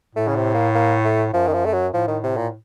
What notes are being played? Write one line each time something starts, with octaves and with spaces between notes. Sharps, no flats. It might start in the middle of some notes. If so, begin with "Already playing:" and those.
A2 A3
C#3
C3
A#3
A#3
A3
F#2 F3
D#3
F3
A3
F#3
A2 F3
D#3
C3
A#2